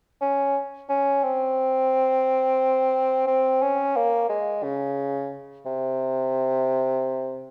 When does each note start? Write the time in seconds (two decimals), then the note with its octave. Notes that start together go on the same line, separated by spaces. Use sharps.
0.21 C#4
0.89 C#4
1.23 C4
3.27 C4
3.62 C#4
3.96 A#3
4.29 G#3
4.63 C#3
5.66 C3